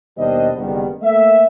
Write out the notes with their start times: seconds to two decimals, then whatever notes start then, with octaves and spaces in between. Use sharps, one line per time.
0.17 D#2 B2 G3 D4 C5 D#5
0.56 F#1 D#3 G3 B3
1.02 A3 A#3 E5